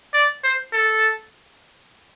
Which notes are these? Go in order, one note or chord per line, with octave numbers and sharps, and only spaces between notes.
D5
C5
A4